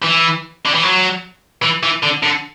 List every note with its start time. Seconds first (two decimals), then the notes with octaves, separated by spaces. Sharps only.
0.03 E3
0.65 D3
0.74 E3
0.83 F#3
1.63 E3
1.83 E3
2.03 D3
2.23 D3